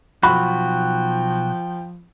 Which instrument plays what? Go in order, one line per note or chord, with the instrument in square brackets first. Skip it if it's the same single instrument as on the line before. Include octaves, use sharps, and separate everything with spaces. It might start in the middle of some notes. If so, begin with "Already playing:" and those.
[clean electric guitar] B1 F#4 [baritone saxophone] F3 [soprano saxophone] G5 [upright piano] B5